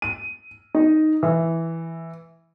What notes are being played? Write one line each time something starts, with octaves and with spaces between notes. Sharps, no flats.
D#7
D#4
E3